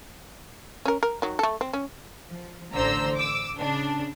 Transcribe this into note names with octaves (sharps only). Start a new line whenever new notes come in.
C#4 A#4
A#4
D#3 F#3
A3 A4
C4
C#4
F3
A1 D3 C5 A#5 E6
D6 E6
C#3 D4